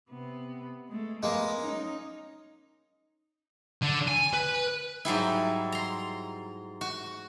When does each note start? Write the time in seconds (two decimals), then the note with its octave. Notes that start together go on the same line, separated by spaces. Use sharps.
0.10 C3 B3
0.88 G#3 A3
1.23 G#3 A#3 B3
1.61 C#4 D#4
3.83 D3
4.08 G#5
4.34 B4
5.05 G#2 F#3 G3 E4
5.72 A#5 C6
6.81 F#4